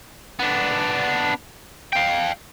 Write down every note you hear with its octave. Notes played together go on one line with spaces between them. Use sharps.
B3 D4
F5 G5